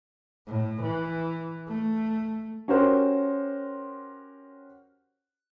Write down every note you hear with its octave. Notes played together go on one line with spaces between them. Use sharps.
A2
E3
A3
C#4 F#4 G4 A#4 C5